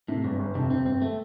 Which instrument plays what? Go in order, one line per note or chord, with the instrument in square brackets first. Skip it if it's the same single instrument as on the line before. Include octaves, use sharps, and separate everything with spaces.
[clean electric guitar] A2 [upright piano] C3
[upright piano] G1 [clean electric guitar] G2
[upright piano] G1
[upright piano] F2 [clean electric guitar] C3
[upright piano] C3 [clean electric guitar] C4
[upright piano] G1 [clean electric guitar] C4
[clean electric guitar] A3